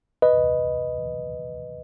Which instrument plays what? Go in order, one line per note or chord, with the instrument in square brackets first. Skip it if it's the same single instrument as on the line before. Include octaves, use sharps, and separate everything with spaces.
[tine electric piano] B4 D#5